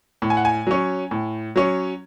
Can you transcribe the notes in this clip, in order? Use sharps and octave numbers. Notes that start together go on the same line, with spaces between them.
A2
G#5
F#5
G#5
F#3 C#4
A2
F#3 C#4